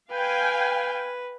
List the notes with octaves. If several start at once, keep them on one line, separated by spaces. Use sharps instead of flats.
B4 F5 G5 G#5